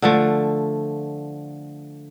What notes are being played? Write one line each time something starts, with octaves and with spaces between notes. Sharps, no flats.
D3 F3 A3